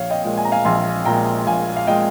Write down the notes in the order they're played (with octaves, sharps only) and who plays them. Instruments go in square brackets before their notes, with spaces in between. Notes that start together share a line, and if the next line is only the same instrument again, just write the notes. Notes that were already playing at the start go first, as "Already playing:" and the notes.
Already playing: [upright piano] A#1 C#5 F5
D#5 G5
A#2 G#3
G#5
A#5
F5 G#5
A#1 G#5 C6
A#2 G#3 G5 A#5
A#1 F5 G#5
F5
A#2 G#3 D#5 G5